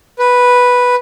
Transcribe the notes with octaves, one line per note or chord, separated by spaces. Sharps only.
B4